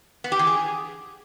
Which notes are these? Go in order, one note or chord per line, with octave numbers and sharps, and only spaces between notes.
B3
G4
E3
G#4